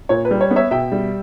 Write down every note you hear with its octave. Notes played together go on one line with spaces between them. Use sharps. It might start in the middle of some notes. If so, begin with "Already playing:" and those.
A#2 C#5
B4
G3
C#5
B3
C#5 E5
B2 E5 G5
G3